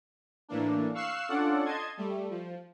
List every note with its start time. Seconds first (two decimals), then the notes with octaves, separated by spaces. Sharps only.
0.49 A2 E3 A#3 D4
0.94 F5 C#6 E6 F#6 C7 E7
1.28 C#4 D4 F4 A4 D5 F#5
1.65 D#5 A5 C6 G#6
1.97 G3 A3
2.30 F3